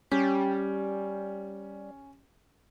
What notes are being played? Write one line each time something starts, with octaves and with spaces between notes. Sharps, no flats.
G3 C#4 G4